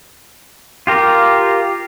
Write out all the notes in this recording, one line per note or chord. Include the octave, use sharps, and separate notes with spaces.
F4 G4 A#4